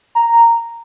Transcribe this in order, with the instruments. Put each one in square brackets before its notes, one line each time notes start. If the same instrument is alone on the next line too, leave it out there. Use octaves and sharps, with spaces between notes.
[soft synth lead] A#5